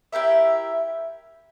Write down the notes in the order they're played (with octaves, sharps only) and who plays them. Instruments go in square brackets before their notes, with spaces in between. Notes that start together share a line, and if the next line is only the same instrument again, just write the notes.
[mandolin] E4 G4 A#4 E5